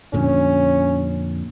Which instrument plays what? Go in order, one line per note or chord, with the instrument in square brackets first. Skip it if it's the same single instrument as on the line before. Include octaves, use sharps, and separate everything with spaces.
[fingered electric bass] F2 A#2 D3 [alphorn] C#4